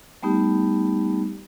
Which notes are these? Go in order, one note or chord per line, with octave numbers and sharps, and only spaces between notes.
G3 A3 B3 D#4 G4